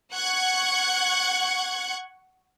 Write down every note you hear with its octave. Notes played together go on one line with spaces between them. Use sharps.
F#5 C#6 F#6 G#6